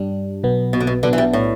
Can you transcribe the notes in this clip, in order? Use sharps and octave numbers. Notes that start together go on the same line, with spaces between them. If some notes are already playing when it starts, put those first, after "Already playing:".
Already playing: G2 G3 D4
B1 B2 B3
B2
D3
B2
B1 B2 D3 B3 D4
E3
G3
A2